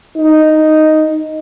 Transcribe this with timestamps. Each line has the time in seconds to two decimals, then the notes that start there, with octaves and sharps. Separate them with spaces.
0.17 D#4